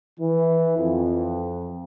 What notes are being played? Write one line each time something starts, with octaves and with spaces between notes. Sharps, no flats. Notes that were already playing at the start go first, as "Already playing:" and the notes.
E3
F2